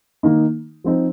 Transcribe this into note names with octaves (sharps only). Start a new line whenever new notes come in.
D#3 A#3 D#4
F3 C4 D#4